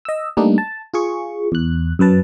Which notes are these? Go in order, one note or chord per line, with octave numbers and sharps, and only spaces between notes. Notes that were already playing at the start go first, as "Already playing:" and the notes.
D#5 E6
G3 A3 A#3 D4 D#4
A5
F4 G#4 C#6
E2 F#6
F#2 F#3 B4 A5